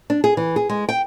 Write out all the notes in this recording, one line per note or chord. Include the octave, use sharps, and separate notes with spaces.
D4
G#4
E3
G#4
G#3
G5